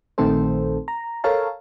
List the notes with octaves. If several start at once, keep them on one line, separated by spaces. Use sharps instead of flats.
A#1 D#3 A3 C4 A4 C5
A#5
A4 A#4 C#5 F5 A5